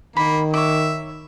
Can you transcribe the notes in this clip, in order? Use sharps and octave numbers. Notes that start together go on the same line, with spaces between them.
D#3 A#3 B5
C#5 E5 D6